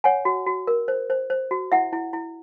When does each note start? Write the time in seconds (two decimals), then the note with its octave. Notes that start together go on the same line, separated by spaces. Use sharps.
0.04 C#5 F#5 G#5
0.25 F#4
0.46 F#4
0.67 A#4
0.88 C5
1.10 C5
1.30 C5
1.51 F#4
1.72 E4 E5 F#5
1.93 E4
2.13 E4